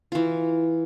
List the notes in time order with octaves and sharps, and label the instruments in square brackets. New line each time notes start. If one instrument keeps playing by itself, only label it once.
[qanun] E3 F4